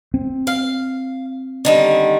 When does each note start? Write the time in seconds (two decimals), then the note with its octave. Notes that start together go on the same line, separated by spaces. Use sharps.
0.14 C4
0.47 F5
1.65 D3 D#3 G3